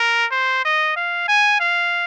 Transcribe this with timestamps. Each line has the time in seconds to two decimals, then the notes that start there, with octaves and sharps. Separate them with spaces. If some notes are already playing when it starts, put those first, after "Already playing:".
Already playing: A#4
0.31 C5
0.65 D#5
0.96 F5
1.28 G#5
1.60 F5